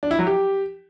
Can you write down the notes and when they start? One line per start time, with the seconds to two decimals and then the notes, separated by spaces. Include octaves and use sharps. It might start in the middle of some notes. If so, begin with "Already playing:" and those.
0.03 D4
0.11 E4
0.19 F#3
0.27 G4